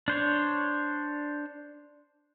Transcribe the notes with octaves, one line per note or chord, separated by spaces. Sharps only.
D4 C5 C#5